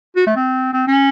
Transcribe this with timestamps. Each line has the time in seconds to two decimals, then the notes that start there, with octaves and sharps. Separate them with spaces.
0.16 F#4
0.26 A3
0.36 C4
0.73 C4
0.88 C#4